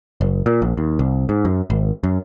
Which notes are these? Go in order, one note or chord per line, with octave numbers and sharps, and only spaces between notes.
F#1
A#2
A#1
D#2
C2
G#2
F#2
G#1
F#2